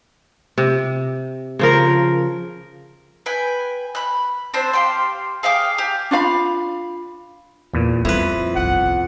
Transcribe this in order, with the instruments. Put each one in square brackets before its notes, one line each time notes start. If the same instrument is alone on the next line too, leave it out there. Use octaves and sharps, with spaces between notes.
[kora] C3
C#3 F3 A#4
[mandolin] B4 G5 G#5
B5 F#6
C4 D4 C5
G4 F5 G5 C6
G#4 F5 G5 D6
G4
[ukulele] D4 F4 F5 B5
[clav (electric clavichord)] E2 A#2
[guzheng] F2 B4 [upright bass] G3 [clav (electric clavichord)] E4
[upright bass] G1 C2 [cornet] F#5